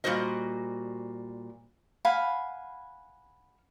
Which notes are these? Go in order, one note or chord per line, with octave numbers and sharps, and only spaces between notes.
A#2 G3 F#4 C5 D#5
F5 F#5 G#5 B5